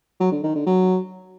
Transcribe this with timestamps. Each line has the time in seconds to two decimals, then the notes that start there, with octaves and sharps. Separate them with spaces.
0.20 F#3
0.32 D3
0.43 D#3
0.55 D3
0.67 F#3